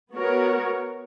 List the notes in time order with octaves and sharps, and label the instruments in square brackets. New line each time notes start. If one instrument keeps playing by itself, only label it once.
[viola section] B3 F#4 A#4 C#5